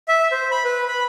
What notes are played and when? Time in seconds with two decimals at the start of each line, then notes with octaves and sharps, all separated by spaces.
0.08 E5
0.32 C5
0.51 B5
0.65 B4
0.88 B5